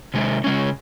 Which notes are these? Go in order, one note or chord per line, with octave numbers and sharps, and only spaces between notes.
C3 D#3 G#3
C#3 G#3 C#4